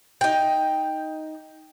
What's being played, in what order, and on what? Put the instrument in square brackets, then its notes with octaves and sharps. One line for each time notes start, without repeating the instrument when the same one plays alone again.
[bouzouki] D#4 G5